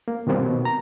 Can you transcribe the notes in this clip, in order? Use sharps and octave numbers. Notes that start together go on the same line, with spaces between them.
A#3
B2 D#3 G3 A#3 C4
B2
A#5